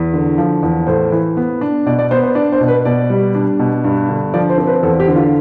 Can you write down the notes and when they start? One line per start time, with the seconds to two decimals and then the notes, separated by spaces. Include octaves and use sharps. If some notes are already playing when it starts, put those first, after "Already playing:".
Already playing: E2
0.14 D3
0.38 F3
0.63 E2
0.87 A2 C5
1.12 E3
1.37 B3
1.61 D4
1.86 B2 D5
1.99 D5
2.11 B3 C5
2.24 C5
2.35 D4 D5
2.52 C5
2.60 B2
2.68 B4
2.85 B2 D5
3.10 G3
3.35 D4
3.59 B2
3.84 G2
4.09 D3
4.34 F3 D5
4.50 C5
4.58 C4
4.67 B4
4.83 E2 A4
5.00 G4
5.08 D3
5.16 F4